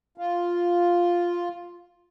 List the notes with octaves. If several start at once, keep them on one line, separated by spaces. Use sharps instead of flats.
F4